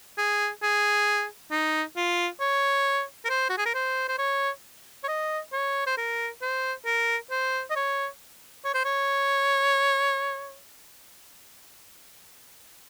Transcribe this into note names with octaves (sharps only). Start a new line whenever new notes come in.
G#4
G#4
D#4
F4
C#5
A#4
C5
F#4
G#4
A#4
C5
C5
C#5
C#5
D#5
C#5
C5
A#4
C5
A#4
C5
D#5
C#5
C#5
C5
C#5